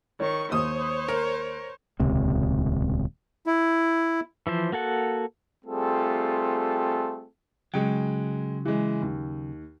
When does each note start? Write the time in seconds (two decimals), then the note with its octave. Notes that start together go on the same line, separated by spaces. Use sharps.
0.20 D#3 C#5 C#6
0.52 D#2 C5 C#5 D#6
1.08 A#4
2.00 D#1 C#2 C3
3.46 E4
4.47 E3 F3 C5
4.72 A#3 F#4 A4 F#5
5.65 G3 A3 C4 F4 G#4 A4
7.74 C#3 F#3 G#3 G5
8.65 E3 G#3
9.02 D#2